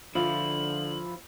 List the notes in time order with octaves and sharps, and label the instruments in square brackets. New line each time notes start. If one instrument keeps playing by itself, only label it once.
[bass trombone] D3 [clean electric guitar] F3 E4 [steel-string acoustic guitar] F4 F5 [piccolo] F#7